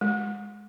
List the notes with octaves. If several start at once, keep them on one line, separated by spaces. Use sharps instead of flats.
G#3